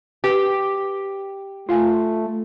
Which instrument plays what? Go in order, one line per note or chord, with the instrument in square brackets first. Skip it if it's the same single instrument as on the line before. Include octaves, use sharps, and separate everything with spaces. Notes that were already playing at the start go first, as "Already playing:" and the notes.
[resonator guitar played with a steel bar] G4 [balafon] B4
[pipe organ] A3 [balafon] F4 F5 G#5